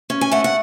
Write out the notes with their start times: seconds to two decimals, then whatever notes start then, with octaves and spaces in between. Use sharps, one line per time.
0.10 C#4
0.21 G#5
0.31 A3 F#5
0.44 F#5